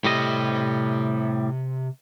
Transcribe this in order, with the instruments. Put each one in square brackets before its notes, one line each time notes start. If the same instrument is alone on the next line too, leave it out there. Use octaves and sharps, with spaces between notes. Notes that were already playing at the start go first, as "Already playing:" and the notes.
[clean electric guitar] A2 G3 D#5 [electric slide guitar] C3 G4